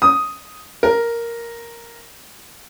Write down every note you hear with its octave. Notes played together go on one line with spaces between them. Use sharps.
D#6
A#4